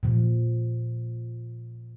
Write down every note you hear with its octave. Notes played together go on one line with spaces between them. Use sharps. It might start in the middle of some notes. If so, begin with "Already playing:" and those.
A#2 F3